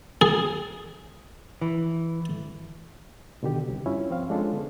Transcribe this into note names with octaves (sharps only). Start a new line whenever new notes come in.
G#4
E3
B2 D3 D#3 G4
C2
G2 C#4 E4 F4
F3 C4 C5 F5
G#3 C#4 D4 F4 G#4 A4
D3 B3